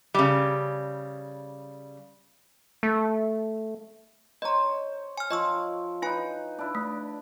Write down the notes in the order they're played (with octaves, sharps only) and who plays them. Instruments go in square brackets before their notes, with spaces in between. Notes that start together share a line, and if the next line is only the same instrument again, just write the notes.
[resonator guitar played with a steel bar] C#3 G3
[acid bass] A3
[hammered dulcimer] C5 C#5 [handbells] D#5 A#5
[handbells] G#5 F6
[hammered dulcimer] F3 [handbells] D#5 C#6 E6
[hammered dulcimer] D#4 B4 [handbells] E4 G#5
[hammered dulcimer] D4 E4
[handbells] A3